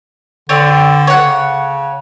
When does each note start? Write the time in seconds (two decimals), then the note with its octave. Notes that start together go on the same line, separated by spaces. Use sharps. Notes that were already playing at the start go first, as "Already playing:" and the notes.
0.49 D3 C4 D4 C#5
1.07 C#5 F#5
1.21 C#3